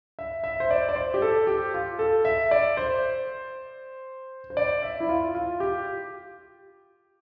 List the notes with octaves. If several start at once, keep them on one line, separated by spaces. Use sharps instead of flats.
E5
E5
C5
D5
D5
C5
G4
A4
G4
F4
A4
E5
D5
C5
C5
D5
E5
E4
F4
F4
G4